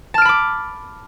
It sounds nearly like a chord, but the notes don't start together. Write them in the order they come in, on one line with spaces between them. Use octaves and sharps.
A5 F6 D7 B5 D6